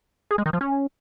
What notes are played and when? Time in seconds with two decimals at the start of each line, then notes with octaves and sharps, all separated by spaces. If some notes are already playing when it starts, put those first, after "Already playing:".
0.31 G#4
0.38 G#3
0.46 D#3
0.53 F3
0.61 C#4